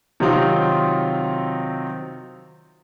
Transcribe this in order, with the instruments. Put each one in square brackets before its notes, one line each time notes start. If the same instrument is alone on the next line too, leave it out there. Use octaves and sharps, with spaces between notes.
[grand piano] C3 D#3 F#3 C4 D#4 F4